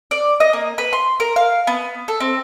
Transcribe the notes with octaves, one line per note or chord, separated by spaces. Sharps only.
D5
D#5
A#3
B4
C6
A#4
F5
B3
A4
C4